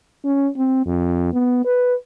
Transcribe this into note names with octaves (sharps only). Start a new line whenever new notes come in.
C#4
C4
F2
B3
B4